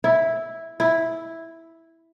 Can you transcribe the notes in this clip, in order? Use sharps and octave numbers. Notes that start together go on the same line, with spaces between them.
E4
E4